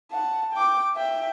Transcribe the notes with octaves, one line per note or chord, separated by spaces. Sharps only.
F#5 A5
G5 D6
E5 G5